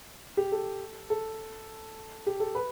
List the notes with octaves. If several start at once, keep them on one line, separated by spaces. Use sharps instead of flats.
G4
A4
A4
G4
A4
B4